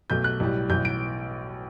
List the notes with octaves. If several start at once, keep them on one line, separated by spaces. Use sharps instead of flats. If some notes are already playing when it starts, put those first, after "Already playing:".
B1 B2 A3 G6
F#6
B1 A2 G3
B1 A2 E3 G6
D7